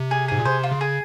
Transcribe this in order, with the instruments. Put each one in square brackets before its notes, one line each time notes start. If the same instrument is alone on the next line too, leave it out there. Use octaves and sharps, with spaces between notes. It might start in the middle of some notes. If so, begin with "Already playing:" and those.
Already playing: [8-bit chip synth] C3
[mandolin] G#4
[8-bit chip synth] G#2 [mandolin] G#4
[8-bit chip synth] A#2
[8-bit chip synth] C3 [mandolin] C5
[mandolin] F4
[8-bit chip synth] C#3
[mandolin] G#4